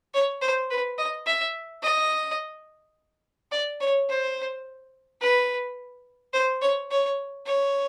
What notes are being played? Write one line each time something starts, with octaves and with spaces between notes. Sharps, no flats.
C#5
C5
B4
D#5
E5
D#5
D5
C#5
C5
B4
C5
C#5
C#5
C#5